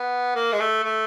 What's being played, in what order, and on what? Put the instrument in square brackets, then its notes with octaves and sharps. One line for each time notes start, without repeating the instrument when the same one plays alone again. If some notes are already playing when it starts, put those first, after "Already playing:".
Already playing: [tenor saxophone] B3
A#3
G#3
A3
A3